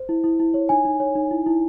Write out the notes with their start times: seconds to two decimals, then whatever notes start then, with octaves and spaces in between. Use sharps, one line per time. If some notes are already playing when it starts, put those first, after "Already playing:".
Already playing: C5
0.09 E4
0.24 E4
0.39 E4
0.54 C#5
0.69 D#4 G#5
0.85 D#4
1.00 C#5
1.15 D#4
1.31 E4
1.46 E4